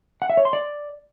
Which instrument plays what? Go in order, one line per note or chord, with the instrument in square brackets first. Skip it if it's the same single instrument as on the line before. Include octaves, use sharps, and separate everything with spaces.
[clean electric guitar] F#5
E5
C#5
C6
D5